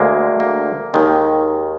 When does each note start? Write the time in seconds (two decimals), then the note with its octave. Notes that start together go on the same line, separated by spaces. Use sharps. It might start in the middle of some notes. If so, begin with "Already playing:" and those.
Already playing: D2 D3 G#3 A#3
0.40 A#3
0.94 D#2 D#3 G#3